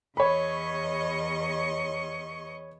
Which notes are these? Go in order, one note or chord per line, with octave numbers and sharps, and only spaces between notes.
E2 C#5 D#5 B5 C#6